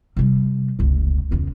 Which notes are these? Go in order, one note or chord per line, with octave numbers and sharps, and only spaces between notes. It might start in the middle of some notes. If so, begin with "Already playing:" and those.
C3 G3
F1 C#2
E2 C#3